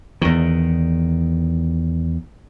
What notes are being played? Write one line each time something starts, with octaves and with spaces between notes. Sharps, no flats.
E2 D#3